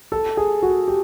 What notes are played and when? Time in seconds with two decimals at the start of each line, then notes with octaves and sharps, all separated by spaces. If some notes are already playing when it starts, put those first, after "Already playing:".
0.12 A4
0.37 G#4
0.63 F#4
0.88 G4